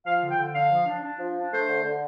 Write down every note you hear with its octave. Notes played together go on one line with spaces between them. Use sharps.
F3 F5
D3
G5
D3
D4 F5
F3
D4
D4
F3
D4
A3 C5
D3
D3